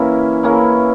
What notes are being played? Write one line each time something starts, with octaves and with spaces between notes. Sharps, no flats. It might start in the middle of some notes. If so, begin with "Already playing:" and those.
Already playing: E3 A#3 C#4 E4
E3 A#3 C#4 E4